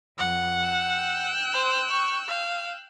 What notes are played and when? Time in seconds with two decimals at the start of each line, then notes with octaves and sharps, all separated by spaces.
0.18 F2 F#5
0.68 G5 E6 F#6
1.53 C5
1.90 C#6
2.29 F5